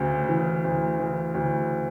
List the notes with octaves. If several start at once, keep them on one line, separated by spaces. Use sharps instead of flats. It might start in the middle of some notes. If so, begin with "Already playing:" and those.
Already playing: D2 C#3
E3
D2
E3
D2